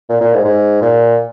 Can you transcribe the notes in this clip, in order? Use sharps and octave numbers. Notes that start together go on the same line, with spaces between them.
A#2
A#2
G#2
G#2
A#2